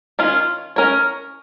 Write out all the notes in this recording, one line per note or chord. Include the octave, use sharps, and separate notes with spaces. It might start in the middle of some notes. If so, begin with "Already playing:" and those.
D#3 C#4 F4
C#4 A#4 C#5